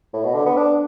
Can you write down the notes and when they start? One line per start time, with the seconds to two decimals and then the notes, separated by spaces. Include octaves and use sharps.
0.13 A2
0.24 B2
0.35 D3
0.46 B3
0.57 D4